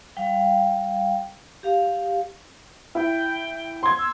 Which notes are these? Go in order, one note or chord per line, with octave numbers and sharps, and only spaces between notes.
G3 F5 G5
G4 F5
E4 G5
C6 G#6
E6